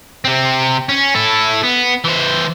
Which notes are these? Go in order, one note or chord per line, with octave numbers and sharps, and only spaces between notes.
C3 C4
C#4
E4 A4
B3
E3 C5